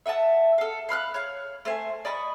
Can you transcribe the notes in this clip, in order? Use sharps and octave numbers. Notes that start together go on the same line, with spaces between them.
E5 F#5 G#5 A5
A4 F5
F5 B5 F6 F#6
C#5 F5
A3 C5 G#5
D5 D#5 B5 C#6